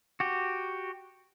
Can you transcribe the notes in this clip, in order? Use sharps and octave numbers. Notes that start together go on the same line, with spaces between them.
F#4 G4